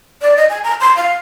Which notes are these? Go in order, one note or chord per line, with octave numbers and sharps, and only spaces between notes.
D5
D#5
G#5
A#5
C6
F5